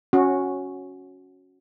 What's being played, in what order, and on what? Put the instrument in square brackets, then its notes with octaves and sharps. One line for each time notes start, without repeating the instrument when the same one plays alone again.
[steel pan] C#4 F#4